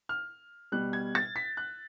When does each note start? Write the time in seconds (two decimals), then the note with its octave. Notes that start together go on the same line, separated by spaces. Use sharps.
0.09 F6
0.72 B2 G3 F#6
0.93 G#6
1.15 A6
1.36 B6
1.57 F#6